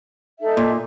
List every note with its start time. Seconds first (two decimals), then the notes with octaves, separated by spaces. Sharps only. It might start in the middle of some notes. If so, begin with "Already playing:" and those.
0.41 D#4 A4 E5
0.57 A#2